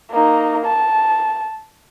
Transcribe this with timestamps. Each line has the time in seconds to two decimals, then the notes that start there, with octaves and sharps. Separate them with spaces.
0.11 A#3 D#4
0.66 A5